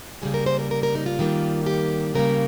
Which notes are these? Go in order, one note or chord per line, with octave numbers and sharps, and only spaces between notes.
C#3 G3 A#3 G#4
A#4
C5
A#4
A#4
A#4
D#4
F4
D#3 G3 A#3
G4
C#3 G3 A#3 A#4